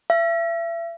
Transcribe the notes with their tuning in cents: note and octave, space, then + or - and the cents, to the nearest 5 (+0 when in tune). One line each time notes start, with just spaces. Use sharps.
E5 +35